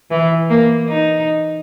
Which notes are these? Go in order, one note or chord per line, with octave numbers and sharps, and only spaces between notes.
E3
A#3
D#4